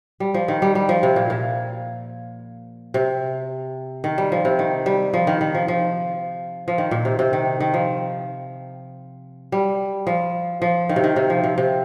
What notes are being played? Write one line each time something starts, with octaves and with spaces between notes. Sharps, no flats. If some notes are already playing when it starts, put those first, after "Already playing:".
G3
F3
D#3
G3
G3
F3
C3
A#2
A#2
C3
D#3
G3
F3
C3
D#3
G3
F3
D#3
D#3
F3
F3
F3
D#3
A#2
C3
C3
D#3
D#3
F3
G3
F3
F3
D#3
C3
D#3
C3
F3
C3
C3